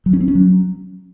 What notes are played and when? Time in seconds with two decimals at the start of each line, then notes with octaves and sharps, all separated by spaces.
0.06 F#3
0.13 C#4
0.21 C4
0.28 C#4
0.35 F#3